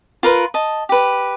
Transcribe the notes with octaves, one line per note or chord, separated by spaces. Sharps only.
F4 A#4 B4
D#5 A5
G4 B4